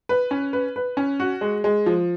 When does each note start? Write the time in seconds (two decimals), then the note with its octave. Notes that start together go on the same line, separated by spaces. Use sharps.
0.09 B4
0.31 C#4
0.53 B4
0.76 B4
0.97 C#4
1.20 F#4
1.41 G#3
1.64 G#3
1.86 F3